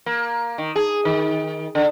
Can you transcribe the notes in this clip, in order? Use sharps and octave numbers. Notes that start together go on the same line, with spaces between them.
A#3
D#3
G#4
D#3
D3